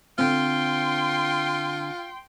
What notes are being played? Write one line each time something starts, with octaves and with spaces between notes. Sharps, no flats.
D3 C4 F4 G5 C6